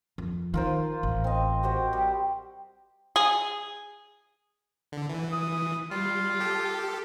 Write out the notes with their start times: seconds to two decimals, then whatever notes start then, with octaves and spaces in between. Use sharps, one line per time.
0.18 F2
0.54 D#3 F4 A#4 C5
1.03 A1
1.24 C4 D#5
1.63 F#4 G4 C5
1.93 G3
3.16 G#4
4.92 D3
5.09 E3
5.32 D#6
5.91 G3 F4
6.40 G4 A4